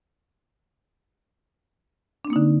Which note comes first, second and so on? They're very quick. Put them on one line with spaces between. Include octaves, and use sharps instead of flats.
D4 C4 A#3 D#4 D3